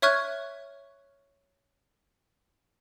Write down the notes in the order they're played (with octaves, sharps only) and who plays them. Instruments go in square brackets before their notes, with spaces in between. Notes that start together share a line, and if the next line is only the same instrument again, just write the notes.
[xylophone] C#5 E5 C#6 F6 F#6 G#6